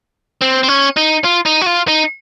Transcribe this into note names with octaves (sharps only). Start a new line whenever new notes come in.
C4
C4
C#4
D#4
F4
D#4
F#4
F4
D#4